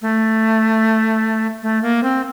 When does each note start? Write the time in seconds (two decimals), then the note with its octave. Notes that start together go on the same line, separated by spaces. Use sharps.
0.02 A3
1.63 A3
1.82 A#3
2.03 C4